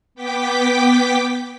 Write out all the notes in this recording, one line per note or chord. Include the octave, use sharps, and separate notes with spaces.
B3 G5 D6 B6